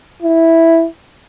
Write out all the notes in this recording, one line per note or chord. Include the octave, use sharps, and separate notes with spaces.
E4